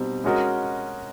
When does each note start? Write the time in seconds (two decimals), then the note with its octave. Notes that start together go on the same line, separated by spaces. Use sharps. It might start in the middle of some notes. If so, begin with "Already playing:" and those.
Already playing: B2 G3 C4 D#4
0.24 G#3 C#4 F#4 A#4 D#5